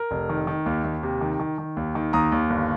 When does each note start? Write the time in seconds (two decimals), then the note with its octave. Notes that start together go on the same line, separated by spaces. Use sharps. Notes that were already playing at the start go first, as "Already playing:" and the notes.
Already playing: A#4
0.11 F1
0.29 D#3
0.47 D#3
0.66 D#2
0.84 D#2
1.03 C3
1.21 D#3
1.40 D#3
1.58 D#3
1.77 D#2
1.95 D#3
2.13 D#2 A#5 D#6
2.32 D#2
2.50 G1